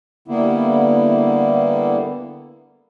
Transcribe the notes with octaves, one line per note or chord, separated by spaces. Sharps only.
D3 G3 A#3 B3 E4